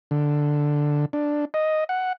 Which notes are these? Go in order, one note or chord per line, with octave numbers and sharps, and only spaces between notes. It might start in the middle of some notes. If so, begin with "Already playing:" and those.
D3
D4
D#5
F#5